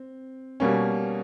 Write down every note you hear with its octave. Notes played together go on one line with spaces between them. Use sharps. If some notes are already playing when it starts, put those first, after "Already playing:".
Already playing: C4
B2 G3 A#3 C#4